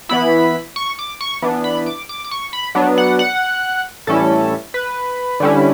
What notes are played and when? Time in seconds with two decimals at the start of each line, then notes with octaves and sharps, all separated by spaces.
0.09 E3 B3 E4 B5
0.76 C#6
0.99 D6
1.21 C#6
1.42 E3 B3 D4
1.64 B5
1.86 D6
2.09 D6
2.25 D6
2.31 C#6
2.53 B5
2.75 F#3 B3 D4
2.98 F#5
3.19 F#5
4.07 A2 E3 G3 C#4 E4 A4
4.74 B4
5.40 D3 G3 C#4 E4